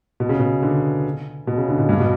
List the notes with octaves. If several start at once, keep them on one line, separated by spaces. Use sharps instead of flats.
B2
C#3
B2
D3
B2
C#3
D3
B2
G2
B2